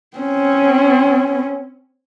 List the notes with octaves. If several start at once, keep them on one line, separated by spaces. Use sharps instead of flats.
C4 C#4